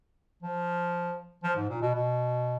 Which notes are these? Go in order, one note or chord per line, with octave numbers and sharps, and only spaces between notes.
F3
F3
G#2
A#2
B2
B2